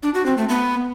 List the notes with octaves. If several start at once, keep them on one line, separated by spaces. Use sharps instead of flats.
D4
F#4
C4
A3
B3